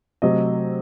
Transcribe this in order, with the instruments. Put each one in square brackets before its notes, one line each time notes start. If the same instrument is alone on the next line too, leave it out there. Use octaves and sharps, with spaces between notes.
[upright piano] C3 F#3 A3 D#5